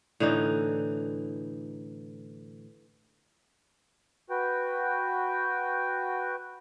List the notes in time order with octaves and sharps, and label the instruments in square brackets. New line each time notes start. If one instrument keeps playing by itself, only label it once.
[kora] A2 D3 E3 D#4
[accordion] F#4 B4 G5